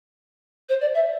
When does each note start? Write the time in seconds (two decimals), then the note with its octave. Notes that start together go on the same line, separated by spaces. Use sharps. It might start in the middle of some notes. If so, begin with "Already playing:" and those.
0.69 C5
0.81 D5
0.94 E5